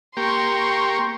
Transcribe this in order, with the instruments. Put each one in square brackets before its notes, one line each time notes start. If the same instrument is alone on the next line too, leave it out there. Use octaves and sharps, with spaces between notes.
[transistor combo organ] A#3 G4 [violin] C6 C#6